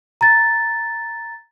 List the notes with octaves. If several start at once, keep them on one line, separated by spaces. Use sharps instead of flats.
A#5 A6